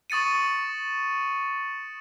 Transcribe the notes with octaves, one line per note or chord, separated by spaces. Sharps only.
C#6 D#6 A6 C#7 D#7